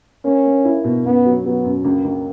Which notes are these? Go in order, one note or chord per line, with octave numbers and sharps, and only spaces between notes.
A#3 C#4
A#3
E4
B2
F#2 B3
F#3
F#3 B3
F#2
C#2 A#3
C#2